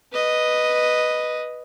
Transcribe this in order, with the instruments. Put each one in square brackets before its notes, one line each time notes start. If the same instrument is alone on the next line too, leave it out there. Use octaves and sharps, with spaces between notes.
[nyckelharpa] B4 D#5